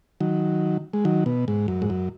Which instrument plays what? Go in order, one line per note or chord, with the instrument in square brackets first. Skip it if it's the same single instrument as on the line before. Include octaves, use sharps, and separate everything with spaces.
[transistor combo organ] D#3 F#3
G#3
D#3 F#3
B2
G#2
F#2
G#2
F#2